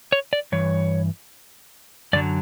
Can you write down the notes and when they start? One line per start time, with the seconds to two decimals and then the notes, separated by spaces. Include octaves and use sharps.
0.12 C#5
0.33 D5
0.52 G2 E3 C#5
2.13 F#2 D3 F#3 D5